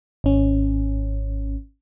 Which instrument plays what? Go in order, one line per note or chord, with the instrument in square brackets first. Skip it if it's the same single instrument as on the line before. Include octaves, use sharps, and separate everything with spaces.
[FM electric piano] G#1 C#4